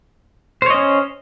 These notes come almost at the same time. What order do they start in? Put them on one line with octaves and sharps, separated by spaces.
C5 C#5 D#5 C#4